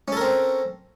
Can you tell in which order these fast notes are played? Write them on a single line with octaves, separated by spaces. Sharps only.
C#4 A4 A#4 C4